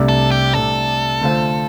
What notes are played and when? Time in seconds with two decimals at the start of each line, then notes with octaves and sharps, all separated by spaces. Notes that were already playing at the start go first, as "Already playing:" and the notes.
Already playing: C2 C3 A3 D4
0.09 A4
0.31 G4
0.53 C2 C3 A3 D4 A4
1.21 D3 A3 F4 C5